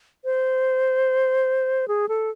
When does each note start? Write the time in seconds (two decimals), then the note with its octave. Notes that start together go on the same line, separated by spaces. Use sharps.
0.25 C5
1.88 G#4
2.09 A4